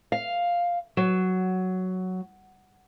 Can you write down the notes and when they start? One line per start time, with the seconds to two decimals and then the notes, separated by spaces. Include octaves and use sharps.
0.12 F5
0.97 F#3